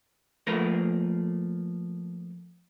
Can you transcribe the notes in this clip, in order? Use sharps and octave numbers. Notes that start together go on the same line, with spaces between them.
F3 A3 A#3 A#4 B4